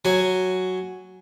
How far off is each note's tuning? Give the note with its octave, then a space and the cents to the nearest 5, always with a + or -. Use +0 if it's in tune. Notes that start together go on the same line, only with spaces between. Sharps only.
F#3 +0 G#5 +0